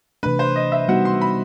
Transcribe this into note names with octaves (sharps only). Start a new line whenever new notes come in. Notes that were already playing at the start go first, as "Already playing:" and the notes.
C3 E3 A3 D4 B4
C5
D#5
E5
G3 B3 D#4 F#4 F#5
C6
B5